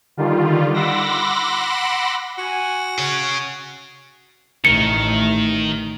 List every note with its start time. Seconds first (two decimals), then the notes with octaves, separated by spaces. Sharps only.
0.17 D3 D#3 G3 F4
0.74 F#5 B5 C6 D6 E6 A#6
2.38 F#4 G#5
2.99 G#4 C#5 F#5
4.65 A1 D#3 A3 C#7